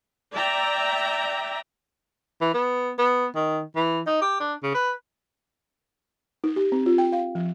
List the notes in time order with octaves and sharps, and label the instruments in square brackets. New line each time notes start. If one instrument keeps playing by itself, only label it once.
[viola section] D5 E5 G5 A#5
[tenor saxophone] E3
B3
B3
D#3
E3
D#4
G4
D4
C#3
B4
[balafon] D#4
G4
C4
F4
G5
F5
F3